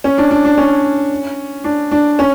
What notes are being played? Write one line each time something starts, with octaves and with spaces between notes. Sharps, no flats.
C#4
D4
D4
D4
C#4
D4
D4
C#4